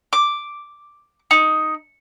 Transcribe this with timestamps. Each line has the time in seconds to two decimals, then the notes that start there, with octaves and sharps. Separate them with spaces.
0.13 D6
1.31 D#4